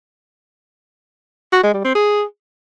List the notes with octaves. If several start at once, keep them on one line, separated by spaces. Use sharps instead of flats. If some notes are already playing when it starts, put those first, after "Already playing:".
F#4
G#3
G3
C4
G#4